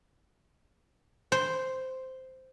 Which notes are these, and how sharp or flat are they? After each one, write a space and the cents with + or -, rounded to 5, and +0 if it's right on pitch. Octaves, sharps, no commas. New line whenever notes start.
C5 -5